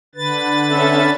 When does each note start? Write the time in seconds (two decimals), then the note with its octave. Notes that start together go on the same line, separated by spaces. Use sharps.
0.15 D3 B4 A6
0.67 C#4 A4 E5